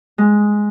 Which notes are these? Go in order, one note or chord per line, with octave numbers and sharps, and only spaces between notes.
G#3